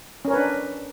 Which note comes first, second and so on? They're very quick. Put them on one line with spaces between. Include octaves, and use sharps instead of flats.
C#4 A#4 C#5 B4 D4